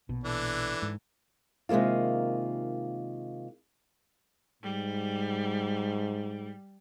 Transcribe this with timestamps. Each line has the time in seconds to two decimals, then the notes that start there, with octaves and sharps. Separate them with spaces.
0.09 A#1 B2
0.24 E3 D4 A4
0.82 G#2
1.69 C3 D#3 G#3 A#3 F4
4.63 G#2 G3